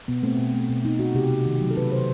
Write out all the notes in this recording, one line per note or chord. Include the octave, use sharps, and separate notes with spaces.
B2 B3
A3 C4
B2
A3
B2
A3 D#4
B2 F#4
C3 G4
C3
D#3
F#3
A4
C3 B4
C3 C5